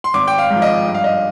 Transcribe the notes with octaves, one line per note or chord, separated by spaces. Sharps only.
C6
G#1 D6
G5
F5
G#2 F3
D#5
G2
F5
D#5